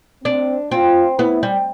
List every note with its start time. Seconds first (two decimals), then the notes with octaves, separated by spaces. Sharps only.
0.24 C4 D4
0.71 C4 F4
1.19 B3 E4
1.43 G3